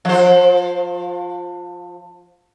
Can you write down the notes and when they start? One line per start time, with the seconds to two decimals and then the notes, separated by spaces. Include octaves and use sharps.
0.05 F3 C5